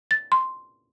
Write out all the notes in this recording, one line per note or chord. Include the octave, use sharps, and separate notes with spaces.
A6
C6